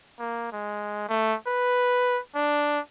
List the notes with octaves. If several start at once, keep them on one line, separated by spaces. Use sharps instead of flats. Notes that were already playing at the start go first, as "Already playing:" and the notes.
A#3
G#3
A3
B4
D4